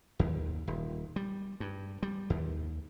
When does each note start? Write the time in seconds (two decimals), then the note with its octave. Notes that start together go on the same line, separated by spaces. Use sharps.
0.19 D#2
0.67 D#1
1.16 G3
1.60 G2
2.03 G3
2.30 D#2